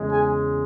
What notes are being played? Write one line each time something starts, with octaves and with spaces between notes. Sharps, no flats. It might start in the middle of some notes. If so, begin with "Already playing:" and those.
Already playing: E2 C#3 G#3
G#4 G#5